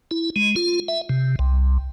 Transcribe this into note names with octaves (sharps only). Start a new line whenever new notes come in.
E4
G#3
F4
E5
C3
C2